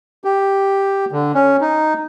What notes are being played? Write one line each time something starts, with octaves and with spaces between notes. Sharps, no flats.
G4
D3
C#4
D#4